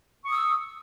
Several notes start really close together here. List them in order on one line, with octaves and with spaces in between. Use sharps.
C#6 D#6 E6